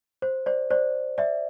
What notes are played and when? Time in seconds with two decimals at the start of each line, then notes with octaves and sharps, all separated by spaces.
0.22 C5
0.46 C5 D5
0.70 C5 D5
1.18 D5 E5